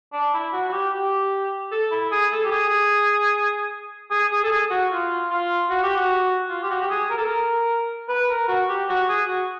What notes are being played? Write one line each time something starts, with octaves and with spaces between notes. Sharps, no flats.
D4
E4
F#4
F#4
G4
G4
A4
E4
G#4
A4
G4
G#4
G#4
G#4
A4
G#4
F#4
F4
F4
F#4
G4
F#4
F4
G4
F#4
G4
G#4
A#4
A4
A#4
B4
A#4
F#4
G4
F#4
G#4
F#4